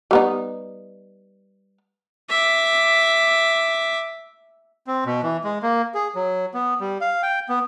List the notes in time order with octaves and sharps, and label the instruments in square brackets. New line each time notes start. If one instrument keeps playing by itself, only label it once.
[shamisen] G3 B3 D#4
[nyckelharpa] E5 D6
[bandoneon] C4
B2
E3
G#3
A#3
G#4
F#3
B3
G3
F5
G5
B3